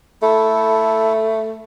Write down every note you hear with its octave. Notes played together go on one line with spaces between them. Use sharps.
A3 E4 A4